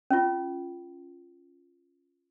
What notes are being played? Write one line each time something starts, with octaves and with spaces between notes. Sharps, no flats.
C#4 F4